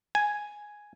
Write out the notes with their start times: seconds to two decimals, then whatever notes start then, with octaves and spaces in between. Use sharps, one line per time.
0.15 G#5